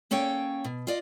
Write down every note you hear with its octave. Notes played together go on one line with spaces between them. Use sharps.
A#3 C#4 A4 C#5 G5
B2
F4 D5 D#5